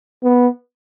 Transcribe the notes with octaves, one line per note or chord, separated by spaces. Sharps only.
B3